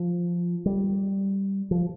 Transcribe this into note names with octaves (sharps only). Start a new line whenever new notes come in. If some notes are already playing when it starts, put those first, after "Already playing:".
Already playing: F3
G3
F3